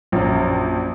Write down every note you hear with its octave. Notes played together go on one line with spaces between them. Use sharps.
A#1 F#2